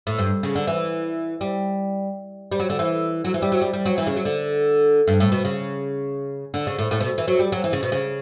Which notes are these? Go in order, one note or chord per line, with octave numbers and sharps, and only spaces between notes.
A2
G2
C#3
D3
E3
G3
G3
F#3
D3
E3
F#3
E3
G3
F#3
G3
G3
F#3
E3
C#3
F#3
D3
G2
A2
B2
C#3
D3
C#3
A2
A2
B2
E3
F#3
G3
F#3
E3
C#3
B2
C#3